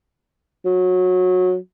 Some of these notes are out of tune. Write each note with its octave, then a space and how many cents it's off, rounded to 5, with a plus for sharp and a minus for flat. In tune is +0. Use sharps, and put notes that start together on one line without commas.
F#3 -20